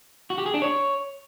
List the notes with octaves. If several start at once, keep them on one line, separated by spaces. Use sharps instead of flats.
F#4
G4
G#4
D4
C#5